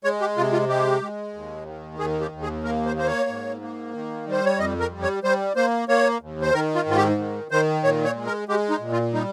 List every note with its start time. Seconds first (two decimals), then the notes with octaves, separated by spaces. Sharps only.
0.04 G#3 C#5
0.21 G4
0.37 C3 F4
0.53 F4
0.69 G#3 G4
1.02 G#3
1.34 D#2
1.66 D#3
1.99 D#2 G#4
2.21 G4
2.32 D#2
2.42 G#4
2.64 A#3 A#4
2.86 C5
2.96 A#3 C5
3.07 C#5
3.29 G#2
3.61 A#3
3.94 D#3
4.27 G3 C5
4.45 C#5
4.59 F2 D#5
4.80 A#4
4.91 G3
5.02 C#5
5.23 G3 C5
5.56 A#3 C5
5.88 A#3 C#5
6.21 D#2
6.42 C5
6.54 D#3 A#4
6.75 F4
6.86 G#2 F4
6.97 G4
7.18 D#3
7.51 D#3 C5
7.83 A#2 C#5
8.05 C#5
8.16 G#3
8.26 A#4
8.48 G#3 G4
8.70 D#4
8.81 A#2
8.92 F4
9.13 G3 D#4